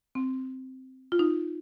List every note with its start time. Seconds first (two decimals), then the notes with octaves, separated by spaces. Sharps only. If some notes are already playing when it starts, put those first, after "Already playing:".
0.15 C4
1.12 F4
1.19 D#4